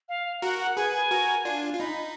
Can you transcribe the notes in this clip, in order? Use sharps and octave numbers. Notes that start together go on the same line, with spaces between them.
F5
F#4 A#4 F#5
F#5
G#4 B4 G#5
G#5
F#4 A#4
D4 F4
F4
D#4 B5